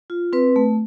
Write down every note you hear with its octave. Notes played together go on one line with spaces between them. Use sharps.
F4
C4 B4
A3